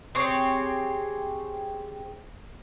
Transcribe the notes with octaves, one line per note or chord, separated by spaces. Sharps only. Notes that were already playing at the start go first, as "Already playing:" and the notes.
C4 G4 G#4 C#5